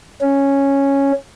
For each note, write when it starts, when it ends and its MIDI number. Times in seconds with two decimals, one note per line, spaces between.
0.21 1.12 61